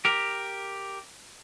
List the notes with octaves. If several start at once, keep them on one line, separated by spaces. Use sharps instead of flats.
G4 A#4